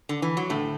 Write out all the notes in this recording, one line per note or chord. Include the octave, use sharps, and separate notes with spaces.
D3
E3
F#3
D2 A2 D3 A3